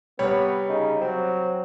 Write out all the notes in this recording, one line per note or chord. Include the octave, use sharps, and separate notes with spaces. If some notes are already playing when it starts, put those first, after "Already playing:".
C3 G3 B3 C#5
C#3 D#4
F#3 C4